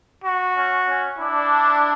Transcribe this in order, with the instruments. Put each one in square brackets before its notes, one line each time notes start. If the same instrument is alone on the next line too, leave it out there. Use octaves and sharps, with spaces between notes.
[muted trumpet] F#4
[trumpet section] C#4
C#4
[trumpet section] D4 [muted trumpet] E4